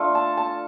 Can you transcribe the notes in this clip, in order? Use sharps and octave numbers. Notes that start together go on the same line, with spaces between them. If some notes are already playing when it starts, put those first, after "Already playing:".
Already playing: A3 D4 F4
A5
A5